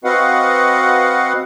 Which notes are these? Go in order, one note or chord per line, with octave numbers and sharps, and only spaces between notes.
C4 F#4 B4 D#5 F5 F#5